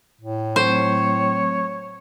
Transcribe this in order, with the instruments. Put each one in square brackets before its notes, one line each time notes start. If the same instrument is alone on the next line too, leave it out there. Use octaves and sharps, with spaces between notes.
[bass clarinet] A2
[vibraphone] F#3 A3 C4 [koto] C5 [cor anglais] C#5